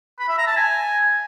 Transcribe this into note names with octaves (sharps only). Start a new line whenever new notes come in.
B5
E5
A#5
A5
G#5